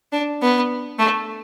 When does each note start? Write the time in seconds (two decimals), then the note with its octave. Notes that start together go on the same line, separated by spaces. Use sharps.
0.12 D4
0.42 B3
0.99 A3